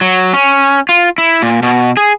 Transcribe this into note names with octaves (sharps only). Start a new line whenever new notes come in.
F#3
C#4
F4
E4
A#2
B2
G#4